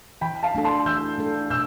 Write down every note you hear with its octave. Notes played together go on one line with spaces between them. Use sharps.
E3 G5 B5
F5 A5
A3 D4 A4
A5 C6
E3 E6 G6
A3 D4 A4
B2 E6 G6